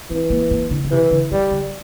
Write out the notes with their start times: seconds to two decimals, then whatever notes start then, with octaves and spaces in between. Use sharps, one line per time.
0.10 E3 C4
0.30 A#3
0.51 A#3
0.71 D3
0.84 D3
0.91 C3 E3
1.11 D3
1.31 E3 G3
1.51 D3